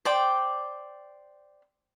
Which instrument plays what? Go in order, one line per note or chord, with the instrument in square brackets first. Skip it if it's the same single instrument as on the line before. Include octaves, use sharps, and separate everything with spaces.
[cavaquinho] C5 D5 G5